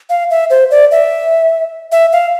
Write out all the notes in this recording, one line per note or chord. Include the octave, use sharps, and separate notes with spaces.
F5
E5
C5
D5
E5
E5
F5